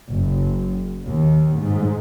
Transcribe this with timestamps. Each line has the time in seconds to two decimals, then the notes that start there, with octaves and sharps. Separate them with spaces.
0.10 F#1
1.06 D#2
1.58 G#2